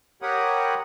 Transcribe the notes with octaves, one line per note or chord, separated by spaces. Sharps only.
G4 A#4 C#5 F#5 B5 D#6